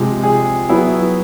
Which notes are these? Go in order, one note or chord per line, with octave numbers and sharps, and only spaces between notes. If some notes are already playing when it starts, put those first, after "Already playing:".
Already playing: C3 F3 G#3
G#4
F#3 B3 E4